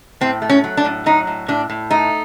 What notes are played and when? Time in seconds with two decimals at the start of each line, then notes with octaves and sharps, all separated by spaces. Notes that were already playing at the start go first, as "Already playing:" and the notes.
0.21 A2 C4
0.42 A3
0.49 C#4
0.64 F#3
0.77 D4
0.85 A2
1.06 F#3 D#4
1.27 A2
1.48 A2 D4
1.70 A2
1.91 A3 D#4